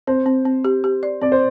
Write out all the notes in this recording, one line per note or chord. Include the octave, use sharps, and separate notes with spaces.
C4 C5
C4
C4
G4
G4
D5
C4 D5
C5